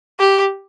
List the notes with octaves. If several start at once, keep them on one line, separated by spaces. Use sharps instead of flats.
G4